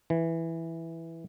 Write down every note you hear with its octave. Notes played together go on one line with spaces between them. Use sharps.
E3